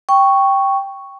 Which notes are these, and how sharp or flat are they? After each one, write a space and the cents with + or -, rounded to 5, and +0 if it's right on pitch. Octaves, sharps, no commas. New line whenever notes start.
G5 +0 C#6 +0